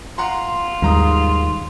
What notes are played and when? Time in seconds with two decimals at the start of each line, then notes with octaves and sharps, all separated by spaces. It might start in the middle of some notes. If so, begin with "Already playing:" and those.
0.18 F4 F#5 A#5 C6
0.82 D#2 G#2 G3 A#5 D#6